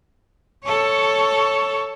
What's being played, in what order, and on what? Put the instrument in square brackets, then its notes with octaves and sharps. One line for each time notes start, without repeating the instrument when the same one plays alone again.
[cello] A4 C#5